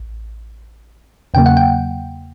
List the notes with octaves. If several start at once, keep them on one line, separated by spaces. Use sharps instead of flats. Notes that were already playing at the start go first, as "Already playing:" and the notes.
Already playing: A1
E2 C#3 F#3 A#3 G5
F#5
G5